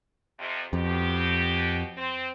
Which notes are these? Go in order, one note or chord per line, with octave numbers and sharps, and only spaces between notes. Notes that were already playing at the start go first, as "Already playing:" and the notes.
F2 C3
F2 B2 G4
C4